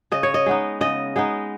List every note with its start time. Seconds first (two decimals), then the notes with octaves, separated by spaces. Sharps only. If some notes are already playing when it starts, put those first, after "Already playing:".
0.12 C#3 D#5
0.23 C#5
0.34 D#5
0.46 G#3 B3 D#4
0.81 C#3 D#5
1.16 G#3 B3 D#4